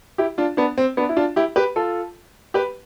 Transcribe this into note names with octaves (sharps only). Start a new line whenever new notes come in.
E4 G4
D4 F4
B3 D4
C4
B3 D4
E4
D4 F4
E4 G4
G4 B4
F4 A4
G4 B4